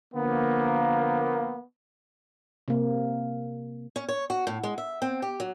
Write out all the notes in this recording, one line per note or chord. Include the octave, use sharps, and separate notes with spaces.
D3 F3 A#3 B3
C3 A#3
C#4
C#5
F#4
A2
G#3
E5
C4
G4
F#3